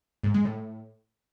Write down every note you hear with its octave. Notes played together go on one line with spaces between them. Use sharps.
G#2
G#3
A2